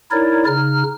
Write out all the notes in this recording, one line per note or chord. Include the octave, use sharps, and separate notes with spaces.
D#4 E4 A#4 C#5 D5
C#3 D#4 F6